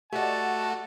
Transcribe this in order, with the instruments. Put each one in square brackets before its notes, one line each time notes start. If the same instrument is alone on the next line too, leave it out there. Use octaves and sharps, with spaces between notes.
[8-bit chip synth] A3 F#4 [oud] G4 D5 D#5 [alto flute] F#5 [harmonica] A5